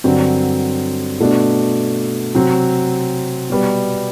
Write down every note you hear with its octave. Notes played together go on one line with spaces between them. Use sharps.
G2 D3 F#3 C4
B2 A3 D4
C3 F#3 C4
B2 G3 B3